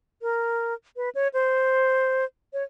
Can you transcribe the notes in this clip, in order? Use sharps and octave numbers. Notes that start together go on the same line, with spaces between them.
A#4
B4
C#5
C5
C#5